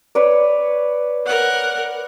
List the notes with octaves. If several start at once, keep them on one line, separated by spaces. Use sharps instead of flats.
B4 C#5 D5
A#4 F#5